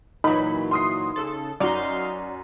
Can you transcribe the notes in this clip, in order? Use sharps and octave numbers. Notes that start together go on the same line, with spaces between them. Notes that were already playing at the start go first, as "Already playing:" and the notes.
A#2 E3 F#3 D#4 B5
C6 D#6 C7
C#3 A4
F#2 D#4 F#4 D5 F5 C6